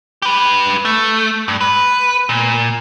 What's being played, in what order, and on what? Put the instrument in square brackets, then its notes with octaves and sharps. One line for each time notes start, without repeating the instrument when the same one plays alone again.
[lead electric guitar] G4 B4
A3
G2
B4
A#2